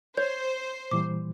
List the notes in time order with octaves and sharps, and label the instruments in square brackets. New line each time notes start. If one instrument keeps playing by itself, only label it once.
[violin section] C5 [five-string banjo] C#5 [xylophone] G6
[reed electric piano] A#2 E3 G3 [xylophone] D6